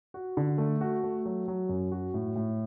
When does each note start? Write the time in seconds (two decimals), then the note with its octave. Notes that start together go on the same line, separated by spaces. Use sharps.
0.14 F#4
0.37 D3
0.58 A3
0.81 F#4
1.04 A3
1.26 F#3
1.48 F#3
1.69 F#2
1.92 F#4
2.14 A2
2.36 A2